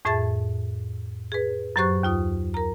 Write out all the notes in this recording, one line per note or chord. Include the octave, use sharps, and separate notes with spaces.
F2 A2 G#4 E5 A5 A6
G#4 B4
F#2 F#3 G4 C5 C#6 F#6
D#2 F4 D#6
A#4 A#5